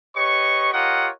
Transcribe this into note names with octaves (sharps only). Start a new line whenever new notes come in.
G4 B4 C#5 D#5 C#6
F4 G4 A#4 C#5 D#5 F#5